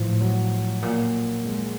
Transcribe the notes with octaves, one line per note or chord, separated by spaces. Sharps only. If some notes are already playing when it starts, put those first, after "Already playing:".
Already playing: A2 E3 F3
F#3
A#2
G#3